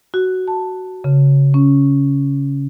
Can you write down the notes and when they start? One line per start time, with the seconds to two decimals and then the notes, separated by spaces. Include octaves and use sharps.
0.14 F#4
0.48 A5
1.04 C#3
1.54 C#4